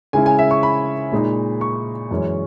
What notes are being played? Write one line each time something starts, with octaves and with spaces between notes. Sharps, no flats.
C#3 G#3 C#4 E4 G#5
G#5
E5
C#6
B5
A#2 G#3 D#4
C#6
F#2 E3 G#3 C#4